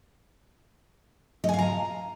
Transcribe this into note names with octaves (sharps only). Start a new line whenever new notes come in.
D#5 F5 G#5 A#5